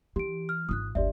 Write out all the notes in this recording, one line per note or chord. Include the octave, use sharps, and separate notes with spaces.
E3 G4 D7
F6
G#1 F4 D#6 F#6
G1 D#2 G4 D5 E5